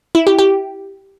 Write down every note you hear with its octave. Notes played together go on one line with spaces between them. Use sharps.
E4
G4
G4